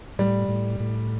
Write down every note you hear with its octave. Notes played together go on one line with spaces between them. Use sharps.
A2 G3
A2
A2